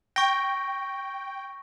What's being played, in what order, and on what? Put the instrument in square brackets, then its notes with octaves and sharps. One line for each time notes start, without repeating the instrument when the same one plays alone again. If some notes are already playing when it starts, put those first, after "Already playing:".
[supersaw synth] G5 [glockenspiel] C#6 A#6